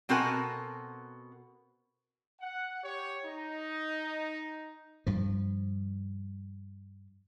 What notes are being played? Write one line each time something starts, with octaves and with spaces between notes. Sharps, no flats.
B2 C4 F#4 A4 A#4 G#5
F#5
G4 C#5
D#4
G2 F3